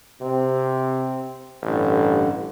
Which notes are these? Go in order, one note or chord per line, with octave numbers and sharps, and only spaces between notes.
C3 C4
A1 G2 D3